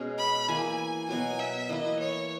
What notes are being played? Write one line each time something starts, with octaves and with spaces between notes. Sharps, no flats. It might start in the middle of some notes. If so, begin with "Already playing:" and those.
Already playing: B2 G#3 C#4 G#4
B5
E3 A#3 E4 G#5
B2 F#3 B3 F#4 G#5
E5
E3 A#3 E4 B4 D#5
C#5